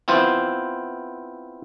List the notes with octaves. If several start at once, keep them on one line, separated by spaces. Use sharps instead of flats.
B3 C4 E4 F4 C5